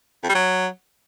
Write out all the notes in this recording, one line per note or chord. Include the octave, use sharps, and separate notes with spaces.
F2
G3
F#3